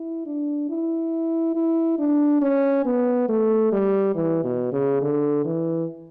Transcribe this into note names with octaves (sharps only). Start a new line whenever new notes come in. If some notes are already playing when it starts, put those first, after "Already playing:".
Already playing: E4
D4
E4
E4
D4
C#4
B3
A3
G3
E3
B2
C#3
D3
E3